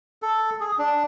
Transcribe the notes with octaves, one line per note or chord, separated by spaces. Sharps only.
A4
G#4
D4